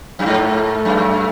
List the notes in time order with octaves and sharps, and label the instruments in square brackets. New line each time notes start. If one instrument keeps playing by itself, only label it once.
[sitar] F#2
[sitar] G#2 [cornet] A3
[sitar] F#2